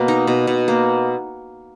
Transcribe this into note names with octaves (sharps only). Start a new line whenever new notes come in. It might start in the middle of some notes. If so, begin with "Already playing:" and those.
Already playing: B2 A#3
D#4
B2
B2
A#3